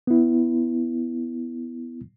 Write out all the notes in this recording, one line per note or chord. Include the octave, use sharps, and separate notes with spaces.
B3 E4